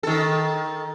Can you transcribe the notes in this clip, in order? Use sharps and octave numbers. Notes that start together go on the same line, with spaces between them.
D#3 A4